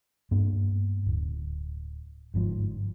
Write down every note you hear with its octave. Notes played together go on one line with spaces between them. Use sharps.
G2 A#3 B3
D1
G1 G#2 F3